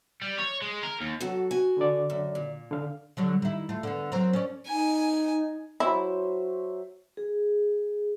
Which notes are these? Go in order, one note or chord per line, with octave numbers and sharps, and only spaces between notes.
G3
C#5
G#3
A#4
D#2
F#3 F#4 A4
F#4 G#5
D3 D5
F#2
A#2
D3 F5
D3 F#3 G3
D#3 E4
A3 F4
D3 B3
F#3 C4 A#4
C#4 D5
D#4 G#5
F#3 E4 C5 E5
G#4